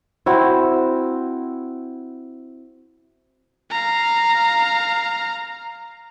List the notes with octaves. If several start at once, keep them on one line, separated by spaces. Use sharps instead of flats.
C4 E4 F#4
F5 A#5